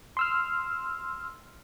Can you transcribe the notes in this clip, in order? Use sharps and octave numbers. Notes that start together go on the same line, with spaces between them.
C6 E6 F6